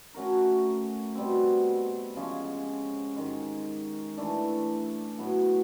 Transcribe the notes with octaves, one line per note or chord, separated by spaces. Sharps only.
A3 C#4 F#4 A#4
B2 G3 C4
C#3 F3 G#3 C#4
G#2 D#3 G#3
E3 A3 D4
A2 F#3 B3